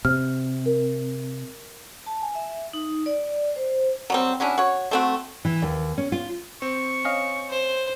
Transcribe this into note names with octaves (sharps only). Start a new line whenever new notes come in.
C3 F6
A#4
A5
G#5
E5
D#4
D5
C5
F#3 G3 C4
C#4 D4 E4 F#4
F#4 C#5
A3 C4 F#4
E3
D#2
C#4
F4
C4 C#6
C#4 D#5 F5
C5